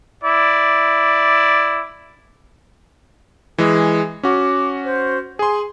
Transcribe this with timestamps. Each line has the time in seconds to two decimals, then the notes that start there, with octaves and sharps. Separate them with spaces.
0.23 E4 D5
3.58 E3 G#3 G#4
4.23 C#4 F#4 D6
4.85 C5
5.39 G#4 G#5 C6